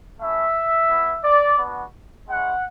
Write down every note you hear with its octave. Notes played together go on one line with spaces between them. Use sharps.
A3 C#4 E4 E5
B3 E4
D5
B3 D4 F#4
G#3 C#4 E4 F#5